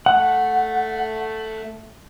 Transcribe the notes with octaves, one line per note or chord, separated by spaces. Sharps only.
A3 F#5